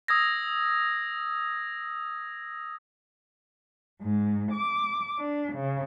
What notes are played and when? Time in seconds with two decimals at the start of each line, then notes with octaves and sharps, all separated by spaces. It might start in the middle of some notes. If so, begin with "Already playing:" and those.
0.08 D#6 E6 G#6 A#6
4.00 G#2
4.51 D6
5.18 D4
5.52 C#3